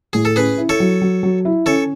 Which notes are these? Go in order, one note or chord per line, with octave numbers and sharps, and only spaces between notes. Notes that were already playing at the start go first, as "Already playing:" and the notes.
A2 G#4
A4
C#4 G#4 B4
E4
A4 C#5
F#3
F#3
F#3
E4
C#4 A4 C#5